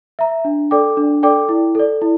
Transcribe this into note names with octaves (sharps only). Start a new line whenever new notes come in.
E5 A#5
D4
A4 D5 G5 D6
D4
A4 D5 G5 D6
E4
A4 D5
E4